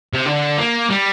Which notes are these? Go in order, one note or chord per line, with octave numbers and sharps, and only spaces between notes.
C3
D3
A#3
G3